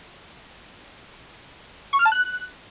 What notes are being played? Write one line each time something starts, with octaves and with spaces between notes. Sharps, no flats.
C#6
F6
A5
F#6